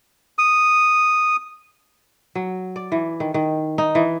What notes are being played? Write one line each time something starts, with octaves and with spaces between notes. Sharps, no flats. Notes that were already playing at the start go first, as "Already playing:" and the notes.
D#6
F#3
D5
E3
D#3
D#3
D#4
E3